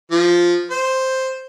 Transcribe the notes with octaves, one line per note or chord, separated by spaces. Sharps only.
F3
C5